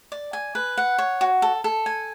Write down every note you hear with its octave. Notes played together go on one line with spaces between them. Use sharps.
D5
G#5
B4
F#5
C#5
F#4
A4
A4
G#5